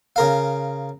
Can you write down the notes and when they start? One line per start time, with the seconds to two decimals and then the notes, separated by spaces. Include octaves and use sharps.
0.16 C#3 A#4 F5